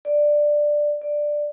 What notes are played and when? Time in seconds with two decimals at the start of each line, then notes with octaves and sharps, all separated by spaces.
0.05 D5
1.02 D5